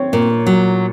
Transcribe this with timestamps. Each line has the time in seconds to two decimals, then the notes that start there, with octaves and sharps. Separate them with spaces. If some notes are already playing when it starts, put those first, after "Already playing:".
Already playing: C4 C#5
0.13 A#2
0.47 F#3